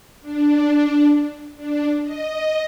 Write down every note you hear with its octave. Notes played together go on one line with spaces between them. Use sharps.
D4
D4
D#5